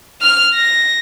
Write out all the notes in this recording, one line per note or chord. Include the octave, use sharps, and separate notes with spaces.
F6
A#6